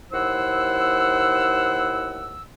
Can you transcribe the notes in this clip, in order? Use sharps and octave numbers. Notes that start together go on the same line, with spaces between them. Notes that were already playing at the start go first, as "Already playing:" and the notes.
D#2 E4 C5 F#5 E6